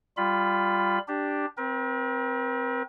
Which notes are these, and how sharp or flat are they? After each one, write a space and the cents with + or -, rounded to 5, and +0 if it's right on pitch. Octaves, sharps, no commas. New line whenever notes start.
G3 +0 F4 +0 B5 +15
D4 +0 G4 +0
C4 +0 A#4 +45